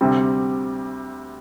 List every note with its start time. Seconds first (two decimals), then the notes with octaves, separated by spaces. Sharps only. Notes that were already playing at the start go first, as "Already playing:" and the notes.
0.01 D2 C3 G3 C4